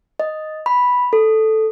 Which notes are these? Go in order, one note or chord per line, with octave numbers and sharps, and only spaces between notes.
D#5
B5
A4